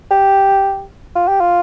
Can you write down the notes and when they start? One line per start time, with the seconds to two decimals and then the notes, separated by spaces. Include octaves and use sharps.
0.11 G4
1.15 F4
1.28 G4
1.40 F4